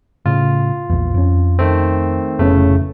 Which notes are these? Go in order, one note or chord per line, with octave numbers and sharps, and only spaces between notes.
A2 C#3 F4
A#1 E2
F2 C#4
D#3 A3 C4
F1 A2 C#3 A3 B3 C#4